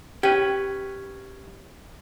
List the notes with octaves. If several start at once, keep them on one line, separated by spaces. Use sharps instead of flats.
C#4 G4 B4 G5